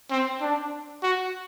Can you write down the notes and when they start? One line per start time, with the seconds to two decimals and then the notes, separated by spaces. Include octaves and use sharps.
0.11 C4
0.41 D4
1.03 F#4